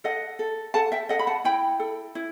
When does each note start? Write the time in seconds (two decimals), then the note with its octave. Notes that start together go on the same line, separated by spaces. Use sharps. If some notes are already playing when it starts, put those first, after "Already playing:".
0.04 A4 D#5 F#5
0.39 A4
0.74 A4 F#5 A5
0.92 E5 G5
1.09 A4 D#5 F#5
1.19 B5
1.27 F#5 A5
1.44 E4 G5 B5
1.80 A4
2.15 E4